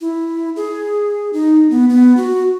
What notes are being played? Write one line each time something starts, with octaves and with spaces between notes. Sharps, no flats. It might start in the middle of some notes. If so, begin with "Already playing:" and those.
E4
G#4
D#4
B3
B3
F#4